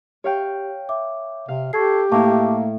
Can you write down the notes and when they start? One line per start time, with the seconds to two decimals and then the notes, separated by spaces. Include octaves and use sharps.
0.24 G4 C#5 F5 G5
0.89 E5 D6
1.48 C3 F5
1.73 G4 A4 C#6 G#6 C7
2.12 A2 A#3 E4 A5 C#6 D6